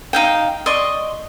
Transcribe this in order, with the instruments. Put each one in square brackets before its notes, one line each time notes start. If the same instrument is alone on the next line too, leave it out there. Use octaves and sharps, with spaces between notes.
[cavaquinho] D#4 F5 G5
D5 D#5 C6 C#6